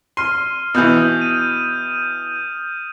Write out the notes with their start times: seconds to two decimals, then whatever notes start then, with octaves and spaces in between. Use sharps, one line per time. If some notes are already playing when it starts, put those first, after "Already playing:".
0.17 C6 F6 D#7
0.74 B2 E3 D#6 G6 F7
1.21 D#7